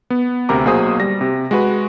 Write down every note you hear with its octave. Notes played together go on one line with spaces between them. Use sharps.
B3
D2 C3 A#4 A#5 D6
B1 A#3 F#4 G#4 C5 D#6
G3 A#6
C3
G#3 F#4 B4